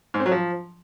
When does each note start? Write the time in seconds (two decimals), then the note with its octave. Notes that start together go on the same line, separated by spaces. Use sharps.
0.14 G#2
0.20 C4
0.26 F#3
0.32 F3